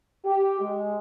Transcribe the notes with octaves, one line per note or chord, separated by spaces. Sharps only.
G4
G#3